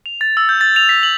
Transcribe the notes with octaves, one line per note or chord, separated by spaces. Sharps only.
F7
A6
E6
G6
A6
F7
B6
F#7